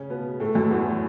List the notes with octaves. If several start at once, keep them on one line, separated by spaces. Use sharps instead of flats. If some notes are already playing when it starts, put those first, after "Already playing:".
Already playing: C#3 C#4
B2 B3
A2 A3
F#2 F#3
E2 E3